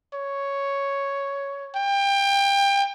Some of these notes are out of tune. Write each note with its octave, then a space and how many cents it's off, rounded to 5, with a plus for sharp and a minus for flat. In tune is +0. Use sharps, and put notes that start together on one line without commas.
C#5 +5
G5 +25